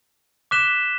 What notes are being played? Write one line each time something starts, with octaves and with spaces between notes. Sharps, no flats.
D6 F#6 B6 E7 G7